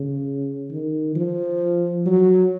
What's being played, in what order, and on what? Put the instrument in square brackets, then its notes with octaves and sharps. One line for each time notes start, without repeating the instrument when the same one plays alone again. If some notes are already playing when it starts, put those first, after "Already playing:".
Already playing: [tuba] C#3
D#3
F3
F#3